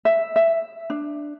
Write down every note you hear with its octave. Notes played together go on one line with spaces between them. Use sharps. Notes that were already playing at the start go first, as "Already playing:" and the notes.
E5
E5
D4